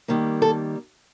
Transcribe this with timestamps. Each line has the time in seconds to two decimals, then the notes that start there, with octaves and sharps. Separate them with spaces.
0.08 D#3 G3 A#3
0.42 A4